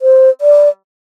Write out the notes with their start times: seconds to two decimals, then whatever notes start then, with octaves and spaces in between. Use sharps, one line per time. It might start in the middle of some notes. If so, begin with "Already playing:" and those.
0.02 C5
0.41 D5